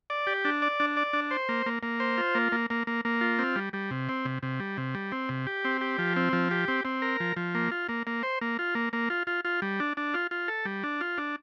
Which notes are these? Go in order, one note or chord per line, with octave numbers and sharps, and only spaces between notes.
D5
G4
D4
D5
D4
D5
D4
C5
A#3
A#3
A#3
C5
F4
A#3
A#3
A#3
A#3
A#3
F4
C4
G3
G3
C3
C4
C3
C3
G3
C3
G3
C4
C3
G4
C4
G4
F3
C4
F3
G4
C4
C4
A#4
F3
F3
A#3
F4
A#3
A#3
C5
A#3
F4
A#3
A#3
F4
F4
F4
G3
D4
D4
F4
F4
A4
G3
D4
F4
D4